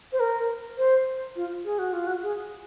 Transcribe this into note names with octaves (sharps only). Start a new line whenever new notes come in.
C5
A#4
C5
F4
G#4
F#4
F4
F#4
G#4